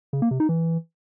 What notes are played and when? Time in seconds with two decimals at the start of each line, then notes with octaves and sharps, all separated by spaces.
0.13 C#3
0.22 A#3
0.31 C3
0.40 D#4
0.49 E3